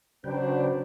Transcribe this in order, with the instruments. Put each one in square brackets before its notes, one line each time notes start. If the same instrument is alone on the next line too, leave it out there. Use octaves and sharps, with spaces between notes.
[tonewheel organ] C#3 B4 G5 [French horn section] F#3 D4 [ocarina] C5